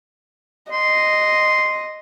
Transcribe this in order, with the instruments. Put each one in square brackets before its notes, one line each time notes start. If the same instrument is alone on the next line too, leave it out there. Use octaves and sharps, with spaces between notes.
[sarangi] D#5 [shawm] C6